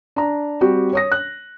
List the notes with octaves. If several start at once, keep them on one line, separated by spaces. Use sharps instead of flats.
D4 A#5
G3 C4 F#4 G4
C#5 D#6 A#6
F#6